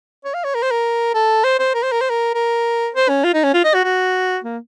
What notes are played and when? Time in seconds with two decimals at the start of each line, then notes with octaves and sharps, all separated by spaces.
0.25 C#5
0.34 F5
0.44 C#5
0.55 A#4
0.63 C5
0.71 A#4
1.14 A4
1.44 C5
1.59 C5
1.74 A#4
1.83 C5
1.92 A#4
2.01 C5
2.10 A#4
2.34 A#4
2.95 C5
3.09 C#4
3.24 F4
3.34 D#4
3.44 C#4
3.54 F4
3.64 D#5
3.74 F#4
3.84 F#4
4.44 A#3